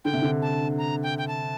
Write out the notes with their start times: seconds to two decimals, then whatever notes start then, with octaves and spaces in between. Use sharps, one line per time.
0.05 D3 G5
0.13 C3
0.22 D3
0.42 A5
0.78 A#5
1.03 G5
1.18 G5
1.28 A5